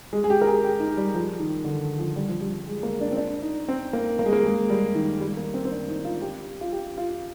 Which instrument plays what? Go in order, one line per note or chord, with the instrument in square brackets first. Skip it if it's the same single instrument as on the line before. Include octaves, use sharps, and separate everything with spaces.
[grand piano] G#3
G#4
G4
A#4
G#4
G4
D#4
G3
F3
D#3
D3
F3
G3
F3
G3
G#3
A#3
D4
C4
D4
D#4
C4
A#3
A#3
G#3
A#3
G#3
G3
D#3
G3
A#3
C4
C4
D4
D#4
D#4
F4
G4
F4
G4
F4